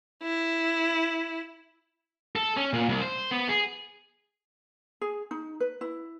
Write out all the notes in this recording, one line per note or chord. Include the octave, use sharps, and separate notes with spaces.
E4
A4
C#4
A#2
C2
C5
B3
G#4
G#4
D#4
B4
E4